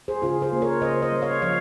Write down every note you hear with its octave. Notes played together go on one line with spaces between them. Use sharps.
G#4 C5
C#3 F4 G#4
G#4 C5
A#3
A#4 C#5
C#3 C5 D#5
C5 D#5
G3
C#5 F5
F3 C#5 F5